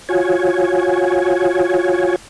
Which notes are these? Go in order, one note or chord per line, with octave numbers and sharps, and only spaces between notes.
F4 F#4 C#5 G#5